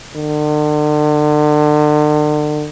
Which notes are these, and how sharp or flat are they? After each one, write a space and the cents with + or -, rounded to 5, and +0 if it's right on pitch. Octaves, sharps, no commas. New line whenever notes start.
D3 +40